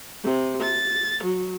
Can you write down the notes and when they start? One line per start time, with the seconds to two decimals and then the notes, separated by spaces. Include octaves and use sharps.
0.24 C3
0.62 A6
1.23 F#3